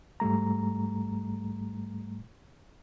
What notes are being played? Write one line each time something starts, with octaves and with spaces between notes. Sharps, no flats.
G#2 G3 A3 A#5